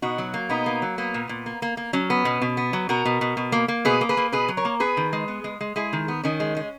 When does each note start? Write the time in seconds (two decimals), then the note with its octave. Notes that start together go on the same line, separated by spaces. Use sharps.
0.02 B2 D#4 F#4
0.18 F#3
0.34 A#3
0.49 B2 B3 D#4
0.66 A#3
0.82 F#3
0.98 A#3 B3
1.14 A#2
1.29 A#2
1.46 A#3
1.62 A#3
1.77 A#3
1.93 F#3 C#4
2.10 B3
2.25 B2
2.42 B2
2.57 B3
2.73 F#3
2.89 B2 F#4 A#4
3.05 B2
3.21 B2
3.37 B2
3.52 A#3
3.68 A#3
3.85 B2 G#4 B4
4.01 A#3
4.09 G#4 B4
4.17 A#3
4.32 B2 G#4 B4
4.48 F#3
4.57 A#4 C#5
4.65 A#3
4.80 B3 G#4 B4
4.97 D#3
5.13 G#3
5.28 B3
5.44 G#3
5.61 G#3
5.76 G#3 E4 G#4
5.93 D#3
6.08 B3
6.23 D#3 C#4
6.40 G#3
6.56 G#3